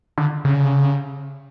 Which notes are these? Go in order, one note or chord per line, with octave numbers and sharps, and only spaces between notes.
D3
C#3